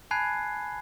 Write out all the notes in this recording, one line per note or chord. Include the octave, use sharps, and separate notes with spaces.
G#5 A5 B5 F#6 G#6 C7